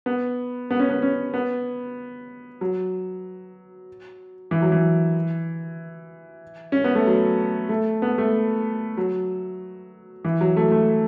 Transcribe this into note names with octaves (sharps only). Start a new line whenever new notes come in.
B3
B3
C#4
B3
C#4
B3
F#3
E3
F#3
E3
C#4
B3
A3
F#3
A3
B3
A3
F#3
E3
F#3
A3
A3